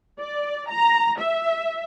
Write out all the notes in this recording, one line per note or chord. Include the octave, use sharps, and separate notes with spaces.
D5
A#5
E5